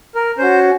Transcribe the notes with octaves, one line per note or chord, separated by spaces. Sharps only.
A#4
C#4 F#4 C5